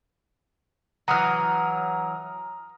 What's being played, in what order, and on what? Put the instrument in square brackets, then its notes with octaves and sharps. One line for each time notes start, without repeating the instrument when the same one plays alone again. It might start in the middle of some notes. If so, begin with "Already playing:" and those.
[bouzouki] E3 F#3 [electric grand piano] A#5 D#6 F6